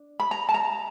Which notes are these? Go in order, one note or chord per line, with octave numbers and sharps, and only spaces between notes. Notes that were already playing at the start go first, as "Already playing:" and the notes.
Already playing: D4
B5
A#5
A5
A#5